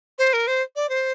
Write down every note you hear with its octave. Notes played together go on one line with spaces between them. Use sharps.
C5
A#4
C5
D5
C5